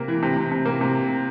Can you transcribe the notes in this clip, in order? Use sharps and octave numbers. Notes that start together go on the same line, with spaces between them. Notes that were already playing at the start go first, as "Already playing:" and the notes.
Already playing: C3 A#3 A#4
E3
C3
C3
C3
A#3
C3